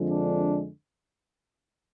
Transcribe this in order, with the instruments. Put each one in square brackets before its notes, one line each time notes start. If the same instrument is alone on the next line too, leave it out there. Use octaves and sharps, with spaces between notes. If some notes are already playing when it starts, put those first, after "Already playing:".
Already playing: [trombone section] F2 D3 F3 G#3
D4